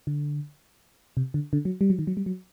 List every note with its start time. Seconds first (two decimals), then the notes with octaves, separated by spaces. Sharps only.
0.07 D3
1.17 C3
1.34 D3
1.53 D3
1.65 F#3
1.81 G3
1.90 F#3
1.99 D#3
2.07 F#3
2.17 G3
2.26 F#3